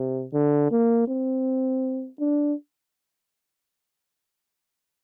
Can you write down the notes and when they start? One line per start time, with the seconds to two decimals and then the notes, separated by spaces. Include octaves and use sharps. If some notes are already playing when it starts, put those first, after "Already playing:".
Already playing: C3
0.33 D3
0.71 A#3
1.08 C4
2.20 D4